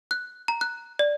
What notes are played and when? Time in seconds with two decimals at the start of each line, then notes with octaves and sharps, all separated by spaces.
0.11 F#6
0.48 A#5
0.61 F#6
0.99 D5